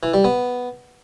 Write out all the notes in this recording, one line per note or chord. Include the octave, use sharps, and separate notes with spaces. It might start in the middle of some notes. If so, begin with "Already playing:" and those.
E3
G3
B3